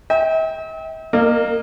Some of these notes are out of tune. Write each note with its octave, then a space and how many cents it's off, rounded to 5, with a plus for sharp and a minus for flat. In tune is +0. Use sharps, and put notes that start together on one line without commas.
E5 -45 G5 +0
A#3 +0 A#4 -25 D#5 -30